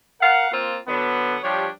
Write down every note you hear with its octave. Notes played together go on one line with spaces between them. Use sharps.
A#4 F5 F#5
A#3 C4 F4
D3 F#3 B3
F3 G3 D4 G4 C#5